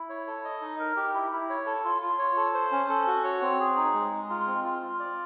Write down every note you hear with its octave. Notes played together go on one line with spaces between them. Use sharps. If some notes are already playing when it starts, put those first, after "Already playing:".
Already playing: E4
C#5
A4
D#5
D#4
A#4
G4
E4
E4
C#5
A4
F4
F4
C#5
A4
C5
C#4
A4
F#4
C#5
C4
G#4
D#4
G#3
G#3
F4
C4
F4
F4
D5